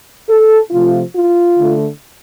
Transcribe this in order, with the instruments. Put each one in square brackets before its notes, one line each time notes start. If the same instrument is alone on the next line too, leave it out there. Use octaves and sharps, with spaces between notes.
[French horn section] A4
C3 F3 A3 F4
F4
D3 A3